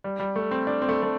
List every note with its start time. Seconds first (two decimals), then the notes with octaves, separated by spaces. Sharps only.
0.04 G3
0.20 G3
0.36 A3
0.51 C4
0.67 D4
0.82 C4
0.89 A3
1.03 A3